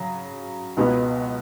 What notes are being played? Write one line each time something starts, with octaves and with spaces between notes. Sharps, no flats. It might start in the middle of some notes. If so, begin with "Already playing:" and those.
Already playing: C#3 F#3
C#2 B2 G#3 B3 F#4